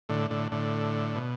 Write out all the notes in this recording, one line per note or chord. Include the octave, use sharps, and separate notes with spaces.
A2 D3
A2 D3
A2 D3
B2